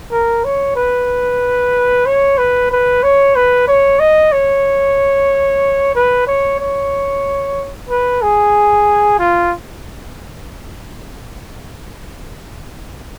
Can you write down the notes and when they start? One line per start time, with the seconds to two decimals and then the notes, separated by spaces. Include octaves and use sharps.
0.11 A#4
0.44 C#5
0.75 B4
2.06 C#5
2.38 B4
2.71 B4
3.03 C#5
3.36 B4
3.68 C#5
4.00 D#5
4.32 C#5
5.95 B4
6.27 C#5
6.60 C#5
7.89 B4
8.22 G#4
9.19 F4